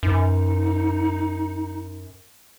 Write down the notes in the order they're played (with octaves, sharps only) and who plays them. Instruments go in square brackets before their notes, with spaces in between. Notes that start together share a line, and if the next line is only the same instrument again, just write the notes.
[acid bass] F#2 [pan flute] D#4